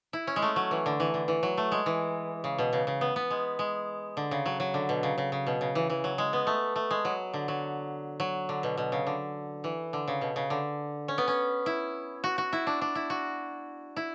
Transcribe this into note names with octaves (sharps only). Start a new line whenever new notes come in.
E4
C#4
G#3
A3
F#3
E3
D3
E3
D3
E3
F#3
A3
G#3
E3
C#3
B2
C#3
C#3
B3
B3
G#3
G#3
D3
C#3
F#3
F#3
D3
B2
C#3
C#3
C#3
B2
C#3
E3
E3
F#3
G#3
B3
A3
A3
G#3
F#3
D3
F#3
F#3
D3
B2
B2
C#3
D3
E3
D3
C#3
B2
C#3
D3
C#4
B3
C#4
E4
F#4
F#4
E4
D4
D4
E4
F#4
E4